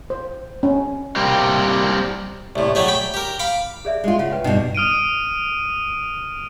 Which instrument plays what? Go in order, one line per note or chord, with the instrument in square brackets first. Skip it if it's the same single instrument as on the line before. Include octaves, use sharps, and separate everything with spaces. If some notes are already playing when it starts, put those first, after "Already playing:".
[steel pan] C5
C#4
[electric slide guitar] G3 A#3 C4 G4
[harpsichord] C2 A2
F#3 A3 G4 G#4
G5 B5
G4 A#4
F5 B5 D6
[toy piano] G#4 D5 E5
[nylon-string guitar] G#3 F4
[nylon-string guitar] C#3 [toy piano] F4 F#5
[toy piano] B4 G5
[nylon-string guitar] G2 B2 [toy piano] D#4 G5
[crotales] D#6 F6 D7 D#7